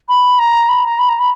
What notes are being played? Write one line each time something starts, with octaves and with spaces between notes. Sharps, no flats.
B5
A#5
B5
A#5
B5
A#5
B5